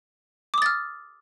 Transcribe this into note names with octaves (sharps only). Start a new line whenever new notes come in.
D6 D#6 F6 A6